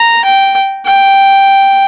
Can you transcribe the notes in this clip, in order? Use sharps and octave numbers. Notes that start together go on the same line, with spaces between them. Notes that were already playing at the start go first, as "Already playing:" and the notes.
Already playing: A#5
G5
G5